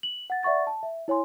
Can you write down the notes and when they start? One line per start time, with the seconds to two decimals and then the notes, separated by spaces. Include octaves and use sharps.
0.03 F#7
0.30 F#5 A6
0.43 D5 E5 F#5 C#6 A6
0.67 A5
0.83 E5
1.08 E4 C#5 G#5 C6